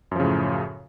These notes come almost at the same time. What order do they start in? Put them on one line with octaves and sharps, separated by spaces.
F#2 F3 C#3 A2